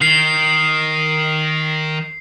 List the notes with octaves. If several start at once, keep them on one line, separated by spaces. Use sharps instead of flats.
D#3 C7